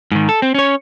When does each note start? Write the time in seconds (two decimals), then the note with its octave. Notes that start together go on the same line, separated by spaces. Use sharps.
0.12 G#2 D#3
0.29 A4
0.42 C4
0.54 C#4 C#5